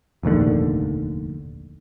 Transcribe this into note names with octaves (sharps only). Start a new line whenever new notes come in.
F1 A#1 D#2 D3